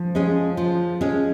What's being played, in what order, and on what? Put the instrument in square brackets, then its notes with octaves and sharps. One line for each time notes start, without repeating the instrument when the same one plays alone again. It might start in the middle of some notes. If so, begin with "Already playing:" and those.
Already playing: [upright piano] F3
[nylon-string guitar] G#3 C#4 G#4
F3
G#3 C#4 G#4